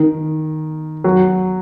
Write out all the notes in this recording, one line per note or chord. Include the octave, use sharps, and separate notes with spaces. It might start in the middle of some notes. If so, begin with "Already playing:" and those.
Already playing: D#3
F#3